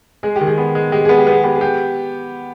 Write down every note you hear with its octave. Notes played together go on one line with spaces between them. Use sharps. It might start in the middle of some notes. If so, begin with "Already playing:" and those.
G#3 G#4
G4
D#3
G#4
B3
G#3
G#3 G4
B3 G#4
G4
B3 G#4
B3 G4
G#4
G4